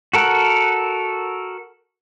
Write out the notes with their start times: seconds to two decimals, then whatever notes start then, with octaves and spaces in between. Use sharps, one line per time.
0.13 F#4 A4 A#4 F#5